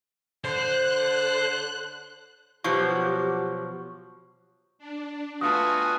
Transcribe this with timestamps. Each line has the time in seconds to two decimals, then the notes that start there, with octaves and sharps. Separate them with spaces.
0.44 D3 C5 F#6
2.64 B2 F3 F#3 G4 C#6
4.79 D4
5.41 A3 B3 F4 F#4 G#5 D#6